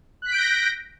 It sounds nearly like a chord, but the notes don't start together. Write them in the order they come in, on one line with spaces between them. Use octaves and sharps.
F#6 B6 D7 G6 A#6